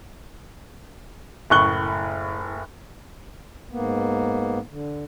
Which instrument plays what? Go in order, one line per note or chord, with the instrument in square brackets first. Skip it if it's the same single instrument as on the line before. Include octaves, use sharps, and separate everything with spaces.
[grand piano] F#1 A2 C#6 F#6 G7
[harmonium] G#2 A#3 B3
D3